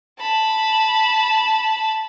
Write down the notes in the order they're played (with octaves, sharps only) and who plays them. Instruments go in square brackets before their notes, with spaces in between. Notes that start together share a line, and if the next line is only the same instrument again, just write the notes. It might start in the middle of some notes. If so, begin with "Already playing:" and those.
[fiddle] A5 B5